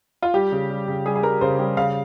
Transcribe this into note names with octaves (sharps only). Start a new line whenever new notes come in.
F4
G3 G4
C#3
G3
C#3
G3 G#4
G#4
G3 A#4
C#3 C5
G3 G4
C#3 F5